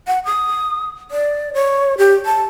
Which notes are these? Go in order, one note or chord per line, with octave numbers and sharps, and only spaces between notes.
F#5
D#6
D5
C#5
G4
A5